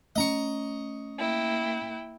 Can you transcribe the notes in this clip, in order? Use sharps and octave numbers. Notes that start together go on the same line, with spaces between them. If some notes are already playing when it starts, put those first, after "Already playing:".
A3 B3 C#4 D#5 A#5 C#6
A#3 E4 G5